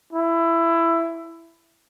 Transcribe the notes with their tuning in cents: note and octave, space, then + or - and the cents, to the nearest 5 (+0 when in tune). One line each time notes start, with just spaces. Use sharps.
E4 +15